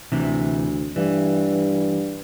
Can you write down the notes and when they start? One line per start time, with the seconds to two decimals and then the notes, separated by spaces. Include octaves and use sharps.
0.12 D2 C3 E3
0.96 G2 E3